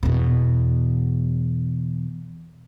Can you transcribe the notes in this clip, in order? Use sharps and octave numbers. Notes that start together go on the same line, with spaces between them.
E2 B2